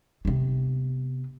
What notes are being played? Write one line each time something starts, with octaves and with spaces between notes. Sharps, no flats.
C3 B3